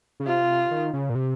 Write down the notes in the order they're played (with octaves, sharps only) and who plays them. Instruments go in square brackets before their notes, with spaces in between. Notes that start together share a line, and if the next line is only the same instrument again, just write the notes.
[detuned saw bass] C#3
[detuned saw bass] C3 [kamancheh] F4
[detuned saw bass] D#3
C#3
A#2
C3